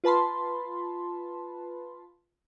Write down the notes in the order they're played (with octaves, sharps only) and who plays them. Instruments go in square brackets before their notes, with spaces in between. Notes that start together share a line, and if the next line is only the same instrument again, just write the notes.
[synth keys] F4 B4 A5 B5 C6